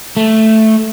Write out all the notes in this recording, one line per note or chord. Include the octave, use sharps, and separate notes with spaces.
A3